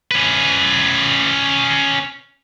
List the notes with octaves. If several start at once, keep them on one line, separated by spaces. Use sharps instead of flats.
C#4 B4